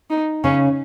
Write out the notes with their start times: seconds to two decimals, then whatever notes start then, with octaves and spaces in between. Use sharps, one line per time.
0.10 D#4
0.44 C#3 C#4